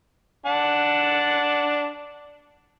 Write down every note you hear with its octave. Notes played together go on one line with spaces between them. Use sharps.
D4 F#5 A5